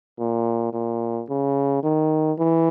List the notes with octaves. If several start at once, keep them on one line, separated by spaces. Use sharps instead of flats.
A#2
A#2
C#3
D#3
E3